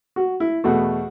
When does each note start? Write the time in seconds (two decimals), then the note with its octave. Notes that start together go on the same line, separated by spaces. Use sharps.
0.16 F#4
0.40 E4
0.64 E2 B2 A3 F#4